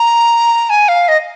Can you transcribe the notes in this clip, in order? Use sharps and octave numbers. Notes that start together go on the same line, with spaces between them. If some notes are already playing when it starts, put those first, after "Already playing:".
Already playing: A#5
G#5
F5
D#5